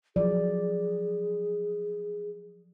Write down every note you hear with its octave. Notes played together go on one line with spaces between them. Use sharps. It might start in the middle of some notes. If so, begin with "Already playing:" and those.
F3 F#3 G#4 D5